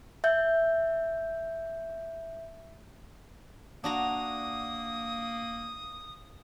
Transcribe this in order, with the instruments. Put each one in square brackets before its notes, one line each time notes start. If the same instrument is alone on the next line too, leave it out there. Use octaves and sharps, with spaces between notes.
[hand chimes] E5 G6
[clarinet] A#3 [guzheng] D4 F#4 A#5 [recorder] D#6